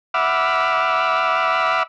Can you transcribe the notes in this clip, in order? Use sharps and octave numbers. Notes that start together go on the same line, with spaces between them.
E5 F#5 B5 D6 E6 F6